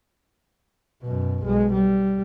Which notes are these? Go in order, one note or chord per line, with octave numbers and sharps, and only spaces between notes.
F#2 B2
B1 G#3
G3